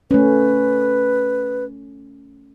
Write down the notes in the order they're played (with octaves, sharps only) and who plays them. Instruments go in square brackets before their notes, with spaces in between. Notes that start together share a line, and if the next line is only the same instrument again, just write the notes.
[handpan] A3 C#4 [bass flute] B4